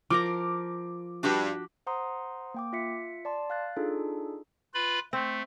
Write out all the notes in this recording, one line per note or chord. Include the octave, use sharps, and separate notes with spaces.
F3 A#4 A#5 D6
G2 D4 F#4 G4
C5 F#5 A#5 C6 D#6
A#3 G5 D6
F4 E5 B6 C#7
D5 A5 C6
F5 F#6 A6
D4 D#4 F4 G#4 A4
F4 B4 B5
A3 C4